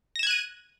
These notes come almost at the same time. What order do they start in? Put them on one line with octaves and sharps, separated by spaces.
A#6 E7 G#6 F#6 D#7